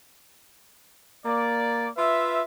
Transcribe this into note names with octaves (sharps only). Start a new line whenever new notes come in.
A#3 D5
F4 B4 E5